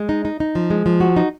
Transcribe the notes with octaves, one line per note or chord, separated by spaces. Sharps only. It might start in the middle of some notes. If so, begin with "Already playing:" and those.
Already playing: G#3
D#4
D#4
D#4
F3
G#3
F3
F#4
D#4